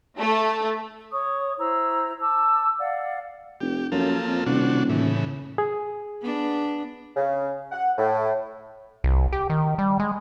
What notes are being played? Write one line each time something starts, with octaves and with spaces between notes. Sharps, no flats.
A3
C#5 C#6 D#6
E4 C5 A#5 E6
A5 D6 E6
D5 F5 F#5
F1 G4
F#2 F3 A#3 A4
F2
D#1 C3 D4 F#4
A2 C#3 E3
G#4
B3 D4
C#3
F#5
A2
C2
G4
D#3
G3
G#3